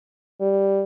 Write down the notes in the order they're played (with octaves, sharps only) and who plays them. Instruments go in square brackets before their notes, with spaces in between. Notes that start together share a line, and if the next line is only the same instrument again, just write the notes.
[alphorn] G3